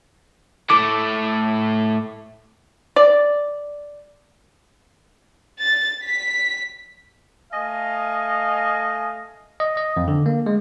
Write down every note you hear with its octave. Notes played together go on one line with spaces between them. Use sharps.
A2 A3 D6
D5
A6
B6
A3 D#5 F5 G#5
D#5
D#5
F2
D3
A#3
G#3